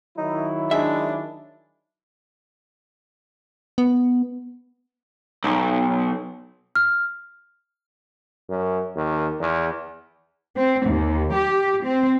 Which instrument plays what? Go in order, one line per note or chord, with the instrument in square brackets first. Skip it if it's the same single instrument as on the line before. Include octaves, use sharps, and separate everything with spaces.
[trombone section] D#3 F#3 E4 [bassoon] D#4
[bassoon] G#3 [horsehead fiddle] D4 [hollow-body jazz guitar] E5
[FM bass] B3
[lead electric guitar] B1
[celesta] F6
[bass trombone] F#2
D#2
E2
[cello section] C4
D#2
G4
C4